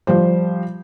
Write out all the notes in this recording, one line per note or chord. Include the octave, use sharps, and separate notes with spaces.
F3 G3 C5